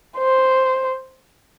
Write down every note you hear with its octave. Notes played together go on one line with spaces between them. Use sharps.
C5